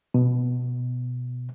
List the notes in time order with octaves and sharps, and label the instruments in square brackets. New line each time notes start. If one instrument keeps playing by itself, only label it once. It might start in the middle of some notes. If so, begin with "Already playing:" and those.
[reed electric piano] B2